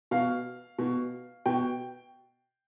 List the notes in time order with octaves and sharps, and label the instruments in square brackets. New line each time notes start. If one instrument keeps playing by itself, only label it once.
[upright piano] B2 F5
B2
B2 G5